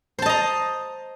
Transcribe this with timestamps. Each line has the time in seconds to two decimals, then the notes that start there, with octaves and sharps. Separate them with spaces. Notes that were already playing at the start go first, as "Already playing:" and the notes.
0.18 C5
0.22 A5
0.26 D#5
0.29 A#5